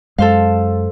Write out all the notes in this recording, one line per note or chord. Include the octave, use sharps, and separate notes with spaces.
F#2 G#3 A4 C5 F5